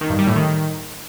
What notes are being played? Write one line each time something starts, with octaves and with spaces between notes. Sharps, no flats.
D#3
G2
G3
A2
D#3